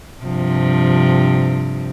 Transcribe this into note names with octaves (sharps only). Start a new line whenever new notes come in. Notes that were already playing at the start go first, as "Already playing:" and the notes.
G2 C3 F3